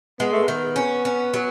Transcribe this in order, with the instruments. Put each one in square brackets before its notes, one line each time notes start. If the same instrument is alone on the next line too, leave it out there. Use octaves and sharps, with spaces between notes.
[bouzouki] G#3 [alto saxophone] B3
[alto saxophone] A3
[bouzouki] D#3 [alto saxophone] B3
[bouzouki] C#4
C#4
F#3